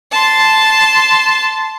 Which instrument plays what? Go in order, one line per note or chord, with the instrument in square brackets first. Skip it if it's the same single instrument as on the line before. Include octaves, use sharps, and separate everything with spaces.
[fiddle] A5 C6